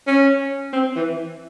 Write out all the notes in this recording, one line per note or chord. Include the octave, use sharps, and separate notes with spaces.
C#4
C4
E3